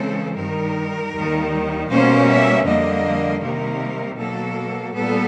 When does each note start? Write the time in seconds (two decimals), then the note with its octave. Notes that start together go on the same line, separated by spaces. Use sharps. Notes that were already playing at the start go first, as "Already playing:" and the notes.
Already playing: C#3 E3 G#3 C4 A4
0.36 G2 D#3 G3 A#4
1.13 D#2 D#3 G3
1.89 B2 G3 A#3 C#4 C5
2.27 E5
2.65 F2 D3 G3 A#3 D#5
3.42 C3 D#3 G3 A#3 A#4
4.19 B2 F#3 A#3 A4
4.95 A#2 G3 B3 A4